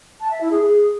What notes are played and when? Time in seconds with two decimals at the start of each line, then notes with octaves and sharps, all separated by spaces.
0.21 A5
0.31 E5
0.41 E4
0.51 G#4
0.61 G#4